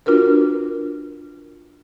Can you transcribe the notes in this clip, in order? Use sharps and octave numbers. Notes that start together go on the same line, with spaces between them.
D4 F4 F#4 A#4 B4